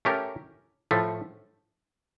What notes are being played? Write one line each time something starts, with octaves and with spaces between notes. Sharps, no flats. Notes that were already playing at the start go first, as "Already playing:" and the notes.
A3 C#4 G4 A#4
A2 F3 A3